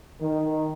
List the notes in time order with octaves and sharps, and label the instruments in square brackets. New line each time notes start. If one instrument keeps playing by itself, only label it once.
[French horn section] D#3